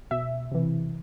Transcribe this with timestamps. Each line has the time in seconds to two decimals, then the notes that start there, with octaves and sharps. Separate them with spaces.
0.11 B2 E5
0.51 C3 E3